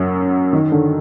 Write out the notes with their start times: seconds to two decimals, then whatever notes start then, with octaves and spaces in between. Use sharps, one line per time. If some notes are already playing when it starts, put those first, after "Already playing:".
Already playing: F#2 F#3
0.53 D#3
0.72 D3